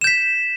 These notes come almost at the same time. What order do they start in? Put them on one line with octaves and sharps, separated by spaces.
E7 G6 B6